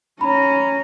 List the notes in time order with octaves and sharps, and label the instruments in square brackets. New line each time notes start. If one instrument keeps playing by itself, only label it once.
[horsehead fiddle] C#4 A#5 [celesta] B5